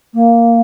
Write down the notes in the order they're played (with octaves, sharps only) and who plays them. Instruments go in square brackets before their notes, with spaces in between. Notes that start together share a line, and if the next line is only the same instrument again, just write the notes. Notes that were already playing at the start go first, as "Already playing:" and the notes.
[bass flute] A#3